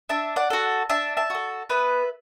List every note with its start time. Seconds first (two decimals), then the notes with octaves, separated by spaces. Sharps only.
0.09 D4 E5 A5
0.36 D5 F#5
0.50 F#4 A4
0.90 D4 E5 A5
1.17 E5 A5
1.30 F#4 A4
1.69 B3 B4 E5